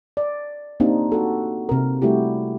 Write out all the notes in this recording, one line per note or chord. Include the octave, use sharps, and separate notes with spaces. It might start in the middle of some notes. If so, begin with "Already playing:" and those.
D5
A#3 C4 D4 D#4 G4
F#4 A4
C3 A#4
G3 A3 E4 F#4 G4